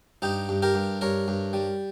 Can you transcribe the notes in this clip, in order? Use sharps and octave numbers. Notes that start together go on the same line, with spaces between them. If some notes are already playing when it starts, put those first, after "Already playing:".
G2 D#4 G4
G2
G4 A#4
G2
G2 A#4 C#5
G2
G3